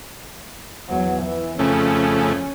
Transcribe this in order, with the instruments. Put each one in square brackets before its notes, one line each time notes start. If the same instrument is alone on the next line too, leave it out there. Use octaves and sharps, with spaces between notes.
[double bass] E2 F#3
E3
[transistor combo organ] F2 C#3 A3 [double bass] C#4